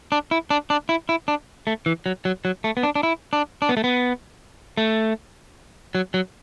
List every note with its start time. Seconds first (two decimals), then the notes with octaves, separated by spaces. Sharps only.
0.12 D4
0.31 E4
0.50 D4
0.70 D4
0.89 E4
1.09 E4
1.28 D4
1.67 A3
1.86 E3
2.06 F#3
2.25 F#3
2.45 F#3
2.64 A3
2.77 B3
2.83 D4
2.95 D4
3.03 E4
3.33 D4
3.62 D4
3.69 B3
3.77 A3
3.84 B3
4.77 A3
5.95 F#3
6.14 F#3